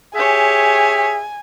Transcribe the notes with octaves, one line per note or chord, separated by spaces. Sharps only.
G4 G#4 C#5 E5 G#5